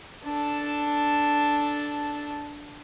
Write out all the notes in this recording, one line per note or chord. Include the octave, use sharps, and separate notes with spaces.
D4 A4